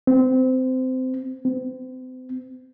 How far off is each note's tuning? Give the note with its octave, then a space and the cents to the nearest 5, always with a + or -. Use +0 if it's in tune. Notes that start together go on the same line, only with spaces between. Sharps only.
C4 -25
C4 -40